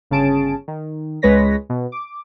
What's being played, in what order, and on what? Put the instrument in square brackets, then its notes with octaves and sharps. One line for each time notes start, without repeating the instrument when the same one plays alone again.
[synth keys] G1 C#3 C#4 G#4 A5 D7
D#3
C#2 G#3 B4 C#5 A#6 B6
B2
D6